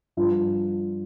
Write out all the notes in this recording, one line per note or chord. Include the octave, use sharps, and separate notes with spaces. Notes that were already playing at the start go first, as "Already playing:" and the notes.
G2 F3 F4